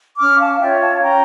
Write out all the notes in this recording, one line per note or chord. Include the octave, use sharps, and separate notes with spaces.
C#4 D6 F6
F5 A5
A5
F4 C#5 E5 G5
F5 A5
A5
C#4 G5 A#5